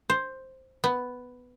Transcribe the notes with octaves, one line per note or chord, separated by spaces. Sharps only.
C5
B3